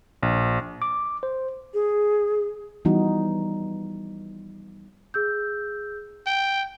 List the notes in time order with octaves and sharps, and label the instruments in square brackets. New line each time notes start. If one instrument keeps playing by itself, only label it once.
[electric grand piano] A#1
[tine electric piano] D6
C5
[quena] G#4
[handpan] E3 F3 G3 B3 D#4 F#4
[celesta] G#4 E6 G6
[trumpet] G5